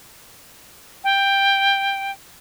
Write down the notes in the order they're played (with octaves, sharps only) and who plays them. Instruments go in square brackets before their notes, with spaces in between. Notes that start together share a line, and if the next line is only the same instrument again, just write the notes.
[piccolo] G5